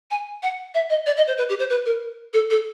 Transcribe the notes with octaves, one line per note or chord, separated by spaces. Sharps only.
G#5
F#5
E5
D#5
D5
D#5
C5
B4
G4
C5
B4
A#4
A4
A4